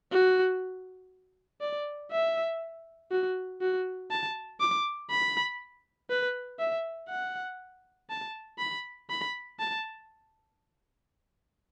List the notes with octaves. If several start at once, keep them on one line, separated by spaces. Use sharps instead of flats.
F#4
D5
E5
F#4
F#4
A5
D6
B5
B4
E5
F#5
A5
B5
B5
A5